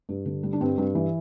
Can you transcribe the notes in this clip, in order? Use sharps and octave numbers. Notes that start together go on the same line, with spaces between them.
G2
D3
G3
D4
G2 C4
G2
E3